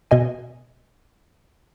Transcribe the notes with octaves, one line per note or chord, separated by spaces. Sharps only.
B2 D#5 G#5